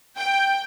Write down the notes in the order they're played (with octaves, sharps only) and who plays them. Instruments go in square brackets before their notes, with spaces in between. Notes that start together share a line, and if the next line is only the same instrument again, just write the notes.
[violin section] G5